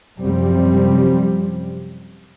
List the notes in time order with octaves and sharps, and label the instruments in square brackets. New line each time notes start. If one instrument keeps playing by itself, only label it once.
[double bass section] F#2 C3 F3 G3 C4